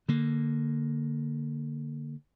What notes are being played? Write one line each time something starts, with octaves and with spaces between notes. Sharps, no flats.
D3 A#3